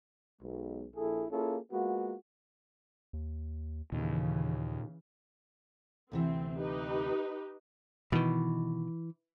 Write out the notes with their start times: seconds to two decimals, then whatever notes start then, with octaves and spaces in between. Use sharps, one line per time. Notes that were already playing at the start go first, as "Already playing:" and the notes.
0.42 B1 G#3
0.95 A#1 E4 G#4 A4
1.31 A#3 C#4 E4 F4 G#4 A4
1.71 G#3 A#3 B3 F4 F#4
3.13 D#2
3.92 D#2 A#2 C#3 E3
6.12 D2 C3 E3 C4
6.58 D#4 G4 B4
8.12 B2 D#3 E3